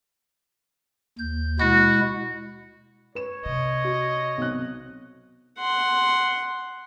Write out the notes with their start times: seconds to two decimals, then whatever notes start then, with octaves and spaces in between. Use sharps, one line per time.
1.18 D#2 G6
1.60 B2 G#3 E4 F#4
3.15 B4 C#5 E7
3.46 C3 D#5
3.84 F#4
4.38 B1 C4 F#6
5.59 F#5 C6